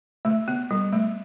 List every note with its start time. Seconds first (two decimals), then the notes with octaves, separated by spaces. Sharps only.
0.25 A3
0.48 B3
0.71 G3
0.92 A3